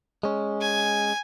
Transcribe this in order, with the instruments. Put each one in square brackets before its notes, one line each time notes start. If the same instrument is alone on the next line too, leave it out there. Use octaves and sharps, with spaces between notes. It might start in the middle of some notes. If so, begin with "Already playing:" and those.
[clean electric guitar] G#3 C#4
[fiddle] G#5